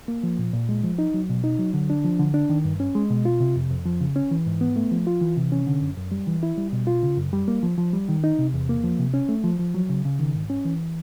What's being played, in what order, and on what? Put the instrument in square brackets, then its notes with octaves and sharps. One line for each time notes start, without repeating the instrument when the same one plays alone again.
[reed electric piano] A#3
F3
A#2
A#2
G#3
F3
D#4
F#3
B2
D#4
F#3
D3
D4
F3
D3
D4
D#3
G2
C#4
G#3
B2
F4
C3
F2
F2
F3
C#3
C#4
E3
G#2
B3
A3
F3
F4
E3
C3
C#4
D3
F#2
F#2
G3
E3
E4
G3
B2
F4
C#3
F#2
G3
A#3
F3
F3
G3
D#3
D#4
C3
E2
A#3
F3
C3
C#4
A3
F3
F3
F#3
C#3
C#3
D#3
G#2
C#4
E3